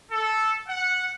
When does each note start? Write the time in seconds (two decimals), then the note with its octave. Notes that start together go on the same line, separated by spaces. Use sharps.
0.11 A4
0.68 F#5